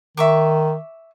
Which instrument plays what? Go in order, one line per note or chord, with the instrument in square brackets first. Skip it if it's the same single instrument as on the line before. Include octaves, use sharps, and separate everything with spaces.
[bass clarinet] D#3 [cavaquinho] E5 C#6 D6